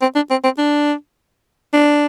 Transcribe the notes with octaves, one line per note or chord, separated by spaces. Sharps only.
C4
D4
C4
C4
D4
D4